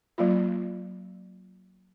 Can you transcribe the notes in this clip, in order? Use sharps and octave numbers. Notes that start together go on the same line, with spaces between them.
F#3 A#3 F4